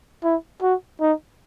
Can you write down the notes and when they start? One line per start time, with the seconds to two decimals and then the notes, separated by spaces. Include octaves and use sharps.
0.24 E4
0.62 F#4
1.01 D#4